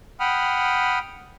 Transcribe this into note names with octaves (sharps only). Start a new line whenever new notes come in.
F#5 G5 B5 D#6 F6